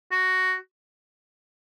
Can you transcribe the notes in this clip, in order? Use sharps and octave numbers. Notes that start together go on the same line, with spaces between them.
F#4